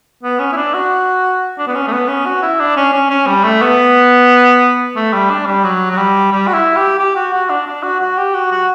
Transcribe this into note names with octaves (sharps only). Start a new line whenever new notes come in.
B3
C#4
E4
D4
F#4
D4
B3
C#4
A3
B3
C#4
F#4
E4
D4
C#4
C#4
C#4
G3
A3
B3
A3
G3
D4
G3
F#3
F#3
G3
G3
F#4
E4
G4
G4
F#4
F#4
D4
D4
F#4
F#4
G4
F#4
F#4